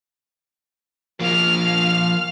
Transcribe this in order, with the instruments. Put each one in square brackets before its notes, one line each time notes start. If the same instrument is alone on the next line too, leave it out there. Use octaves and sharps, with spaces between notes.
[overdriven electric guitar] F3 A#3 [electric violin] F5 F6